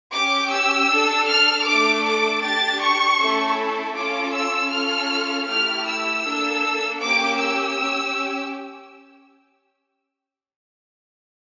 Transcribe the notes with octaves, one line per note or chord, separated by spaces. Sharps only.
C#4 G4 D6
E6
D4 A4
F6
A3 D4 A4 D6
D6
D4 G4 A6
C#6
A3 C#4 E4 A4
C#4 F4 A4 D6
E6
C#4 F4 A4 F6
A3 E4 G4 F6
E6
A#3 D4 A4
A#3 C#4 G4 D6
E6
C#4 G4